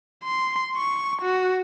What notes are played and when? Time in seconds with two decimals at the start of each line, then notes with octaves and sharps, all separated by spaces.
0.24 C6
0.77 C#6
1.22 F#4